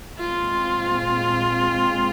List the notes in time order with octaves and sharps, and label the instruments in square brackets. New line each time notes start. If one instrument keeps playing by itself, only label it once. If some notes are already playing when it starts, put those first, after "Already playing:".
[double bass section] A#2 G#3 C4 [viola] F4